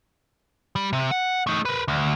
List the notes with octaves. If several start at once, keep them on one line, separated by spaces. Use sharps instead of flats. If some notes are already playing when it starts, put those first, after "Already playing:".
G3
C3
F#5
A3 D#4
A#4 B4
D2